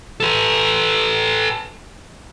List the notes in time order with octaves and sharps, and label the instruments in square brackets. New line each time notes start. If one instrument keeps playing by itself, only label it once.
[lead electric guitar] A4 B4